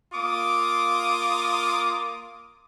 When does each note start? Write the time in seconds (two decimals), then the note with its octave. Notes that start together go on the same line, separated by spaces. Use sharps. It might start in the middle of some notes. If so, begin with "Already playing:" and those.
0.13 A#3 F4 D6 D#6